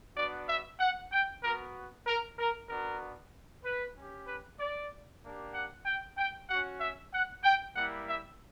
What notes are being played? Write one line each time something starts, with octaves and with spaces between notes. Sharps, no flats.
B3 D4 F#4 D5
E5
F#5
G5
B3 F#4 A#4
A#4
A#4
B3 D4 F#4 A#4
B4
C#4 G4
B4
D5
A#3 D4 G4
F#5
G5
G5
C#4 F#4 F#5
E5
F#5
G5
G3 A#3 E4 F#5
E5